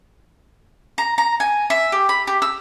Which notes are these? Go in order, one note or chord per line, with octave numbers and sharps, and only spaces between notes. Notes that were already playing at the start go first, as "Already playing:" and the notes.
A#5
A#5
G#5
E5
G4
B5
G4
E6